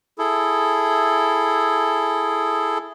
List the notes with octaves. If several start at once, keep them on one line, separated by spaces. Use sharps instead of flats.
E4 G#4 A4